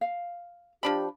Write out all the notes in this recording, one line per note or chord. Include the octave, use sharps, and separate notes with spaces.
F5
F3 D4 G4 B5